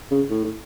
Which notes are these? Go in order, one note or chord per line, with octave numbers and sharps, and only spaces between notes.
C#3
A2
A2